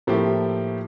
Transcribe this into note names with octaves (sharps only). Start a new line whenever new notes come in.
A2 F3 A3 A#3 E4 G4